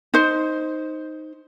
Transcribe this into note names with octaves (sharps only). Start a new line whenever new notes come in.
D#4 C5